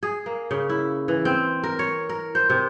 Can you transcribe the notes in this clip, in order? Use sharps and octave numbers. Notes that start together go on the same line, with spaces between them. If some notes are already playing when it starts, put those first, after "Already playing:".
G#4
A#3
C#3
E4
E3
C4
A#4
C#5
A#4
C5
C3